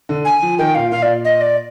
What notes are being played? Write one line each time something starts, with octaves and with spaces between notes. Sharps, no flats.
D3
G#5
F3
D#3 G5
A#2 F5
A#2 F5
D5
D#5
D5